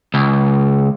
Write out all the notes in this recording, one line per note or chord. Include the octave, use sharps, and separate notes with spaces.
C#2